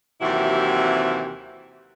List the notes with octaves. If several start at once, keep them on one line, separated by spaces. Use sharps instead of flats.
D#2 C3 E3 F#3 C4 E4